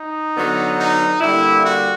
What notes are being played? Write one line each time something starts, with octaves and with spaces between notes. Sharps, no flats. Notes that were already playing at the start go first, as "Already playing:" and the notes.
Already playing: D#4
D3 F#3 B3
D#4
D3 G3 A#3 E4
F#4